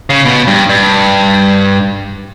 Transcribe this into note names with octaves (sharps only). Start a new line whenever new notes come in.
C#3
B2
G2
G2